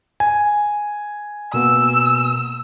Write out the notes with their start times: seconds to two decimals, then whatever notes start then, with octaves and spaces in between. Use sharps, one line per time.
0.20 G#5
1.54 B2 A#3 B3 E6